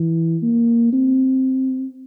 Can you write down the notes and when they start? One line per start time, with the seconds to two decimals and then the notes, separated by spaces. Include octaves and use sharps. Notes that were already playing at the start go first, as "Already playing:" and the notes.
Already playing: E3
0.43 A#3
0.93 C4